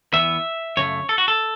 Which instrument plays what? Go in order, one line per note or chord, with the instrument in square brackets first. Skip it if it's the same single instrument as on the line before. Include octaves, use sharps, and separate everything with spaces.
[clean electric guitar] E2 E3 B3 E5
F#2 C#3 A3 C#5
A4
F#4
A4